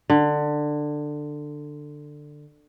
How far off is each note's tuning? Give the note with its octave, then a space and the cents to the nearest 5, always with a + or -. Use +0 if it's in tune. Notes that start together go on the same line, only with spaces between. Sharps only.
D3 +15